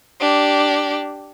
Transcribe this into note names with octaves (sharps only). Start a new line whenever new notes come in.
D4 G4